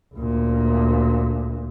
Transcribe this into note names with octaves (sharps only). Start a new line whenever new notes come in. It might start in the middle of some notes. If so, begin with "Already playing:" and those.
D2 A#2